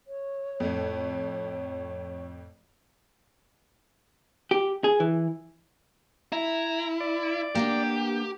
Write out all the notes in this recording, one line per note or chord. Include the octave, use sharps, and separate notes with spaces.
C#5
F2 A2
G4
G#4
E3
E4 A#5
D5
A#3 B3 D4 G4